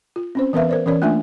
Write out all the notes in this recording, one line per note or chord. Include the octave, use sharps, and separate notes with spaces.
F4
C4 C#4 C5
E3 B3 A#4 B4 E5 F5
A#4 C5 D5
E3 C#4 A#4 C#5 D5
A3 A#3 D4 F4 E5 G#5